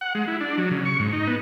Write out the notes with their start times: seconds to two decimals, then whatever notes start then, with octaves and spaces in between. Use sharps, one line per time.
0.01 F#5
0.15 G#3
0.28 E4
0.41 D4
0.58 F#3
0.71 C#3
0.85 C#6
0.99 G#2
1.13 D#4
1.27 B3